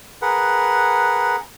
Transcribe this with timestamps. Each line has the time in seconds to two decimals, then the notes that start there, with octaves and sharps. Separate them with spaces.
0.22 G#4 A#4 B4 F#5